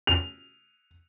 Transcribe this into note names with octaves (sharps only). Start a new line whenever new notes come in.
F7